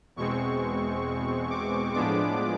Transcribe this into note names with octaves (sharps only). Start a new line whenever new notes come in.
E2 B2 G#3 C4 C#6
D6
A2 F3 G#3 B3 D4 D6